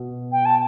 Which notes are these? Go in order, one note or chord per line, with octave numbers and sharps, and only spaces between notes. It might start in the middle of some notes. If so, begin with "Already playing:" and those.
Already playing: B2
G5
A5